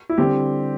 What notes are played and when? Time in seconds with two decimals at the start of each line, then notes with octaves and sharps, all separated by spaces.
0.09 E4
0.18 D3 G3 C4 G4